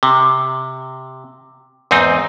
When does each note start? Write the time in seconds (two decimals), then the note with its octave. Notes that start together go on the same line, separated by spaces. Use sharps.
0.03 C3
1.91 E2 G#2 C4 D#4